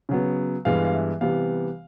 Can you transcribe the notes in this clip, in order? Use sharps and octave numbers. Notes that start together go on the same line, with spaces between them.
C#3 F#3 B3
G2 E3 G#3 B3 F5
F5
E5
C3 E3 G3 B3 F5